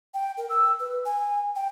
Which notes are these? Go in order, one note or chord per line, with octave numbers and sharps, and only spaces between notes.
G5
A#4
E6
B4
G#5
G5